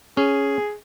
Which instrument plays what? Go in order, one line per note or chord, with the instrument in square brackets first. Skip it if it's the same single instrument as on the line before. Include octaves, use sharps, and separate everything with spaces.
[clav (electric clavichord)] C#4 [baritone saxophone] G#4